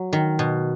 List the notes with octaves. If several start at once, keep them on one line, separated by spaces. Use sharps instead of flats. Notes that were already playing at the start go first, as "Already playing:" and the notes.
Already playing: F#3
D#3
B2